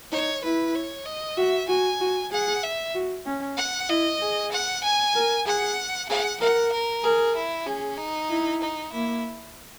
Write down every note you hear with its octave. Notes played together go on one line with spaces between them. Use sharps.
D#4 C#5
E4 B4
C#5
D#5
F#4 E5
F#4 G#5
F#4
G#4 F#5
E5
F#4
C#4
F#5
E4 D#5
G#4
F#5
G#5
A#4
G#4 F#5
G#4 F#5
A#4 F#5
A#4
G#4 A#4
E4
C#4 G#4
D#4
E4
D#4
A#3 E4